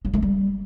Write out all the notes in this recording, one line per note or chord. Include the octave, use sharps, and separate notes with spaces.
F#3
A3
G3